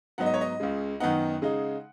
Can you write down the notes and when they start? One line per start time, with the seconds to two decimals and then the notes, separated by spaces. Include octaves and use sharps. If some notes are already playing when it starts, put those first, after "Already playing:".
0.18 G#2 F#3 B3 D#4 F#5
0.26 D#5
0.34 C#5
0.41 D#5
0.60 C#2 C#3 G#3
1.00 F#2 D#3 B3 D#4 F#5
1.42 C#3 G#3 D#4